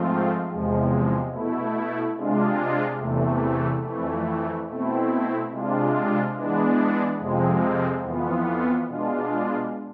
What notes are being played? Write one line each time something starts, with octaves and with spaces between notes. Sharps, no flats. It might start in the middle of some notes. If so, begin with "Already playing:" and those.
Already playing: G#2 F3 A3 C4 F4
E2 C3 F3 G#3
B2 A3 E4
C3 G#3 D4 F4
E2 C3 E3 A3
F2 E3 A3
B2 A3 C4 E4
C3 G#3 D4 F4
E3 G#3 B3 D4
F2 C3 F3 G#3 C4
F2 E3 B3 F4
B2 G#3 D4 F4